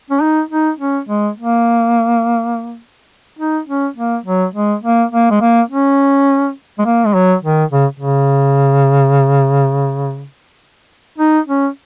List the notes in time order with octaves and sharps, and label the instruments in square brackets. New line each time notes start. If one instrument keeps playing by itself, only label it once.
[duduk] C#4
D#4
D#4
C#4
G#3
A#3
D#4
C#4
A#3
F#3
G#3
A#3
A#3
G#3
A#3
C#4
G#3
A#3
G#3
F#3
D#3
C#3
C#3
D#4
C#4